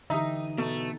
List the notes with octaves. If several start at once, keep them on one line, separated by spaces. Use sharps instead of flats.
D3 E3 D#4 G4 E5 A#5 D#6
B2 A3